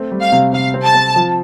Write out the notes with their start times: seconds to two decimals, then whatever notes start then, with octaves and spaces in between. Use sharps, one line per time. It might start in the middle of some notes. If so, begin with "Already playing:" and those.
Already playing: A3 C4
0.12 G3
0.22 F5
0.32 C3
0.53 C3 F5
0.74 C4
0.85 A5
0.95 C4
1.16 F3